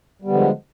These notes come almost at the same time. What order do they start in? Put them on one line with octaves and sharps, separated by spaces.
G3 B3 D3 F3 G#3